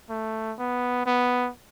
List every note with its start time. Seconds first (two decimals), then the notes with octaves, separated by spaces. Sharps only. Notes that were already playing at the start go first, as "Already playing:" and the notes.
0.10 A3
0.58 B3
1.06 B3